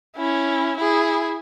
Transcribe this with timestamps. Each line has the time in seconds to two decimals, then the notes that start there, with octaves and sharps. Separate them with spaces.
0.16 C#4 E4
0.77 E4 G#4